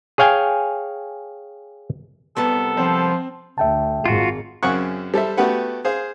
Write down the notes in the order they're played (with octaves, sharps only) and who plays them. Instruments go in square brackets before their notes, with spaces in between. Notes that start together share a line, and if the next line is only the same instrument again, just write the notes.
[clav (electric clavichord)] G#4 C#5 F5 G5 G#5
[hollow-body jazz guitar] C2 B3 A5 [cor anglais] A4
[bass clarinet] F3 [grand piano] C4
[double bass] D2 [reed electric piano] E5 G5 A5
[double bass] G#1 G#2 [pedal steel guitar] F4 F#4
[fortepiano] F#2 C#3 C4 F#5 C#6 F#6
G3 A4 C5 E5
A3 B3 F#4 G4 B4 F#5
G#4 C5 F5